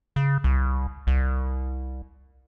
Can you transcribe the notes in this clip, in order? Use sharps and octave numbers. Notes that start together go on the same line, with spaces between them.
C#3
C2
C2